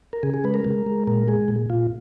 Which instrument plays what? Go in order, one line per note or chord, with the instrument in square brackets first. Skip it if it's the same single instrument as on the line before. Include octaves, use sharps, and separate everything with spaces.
[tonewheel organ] A#4
C#3 G#4
G#4
G#3 B4
A#4
G#3
G#3
A#2 A#4
G#3 G#4
A#2
A#2 F4